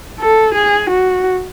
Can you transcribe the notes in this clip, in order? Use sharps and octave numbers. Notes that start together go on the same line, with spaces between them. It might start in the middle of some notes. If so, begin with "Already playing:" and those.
A4
G#4
F#4